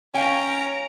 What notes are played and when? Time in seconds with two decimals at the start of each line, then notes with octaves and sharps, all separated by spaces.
0.14 C#4 C#5 F5 G5 A#5 D7